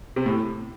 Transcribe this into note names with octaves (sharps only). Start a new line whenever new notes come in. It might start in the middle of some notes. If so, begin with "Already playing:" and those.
C3
A2